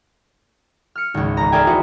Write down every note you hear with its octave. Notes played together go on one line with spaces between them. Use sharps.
F6 C#7
G#1 C#2
E1 A#5
G#4 A#4 D5 E5 G5 G#5
E4 F#4 B4 C5 D#5